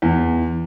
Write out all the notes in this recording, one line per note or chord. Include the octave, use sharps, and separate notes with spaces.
E2